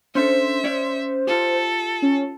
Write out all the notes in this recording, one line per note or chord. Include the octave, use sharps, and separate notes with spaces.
C#4 D4 A4 C5 E5
C#4 C#5 D5
F4 G4 A4
C#4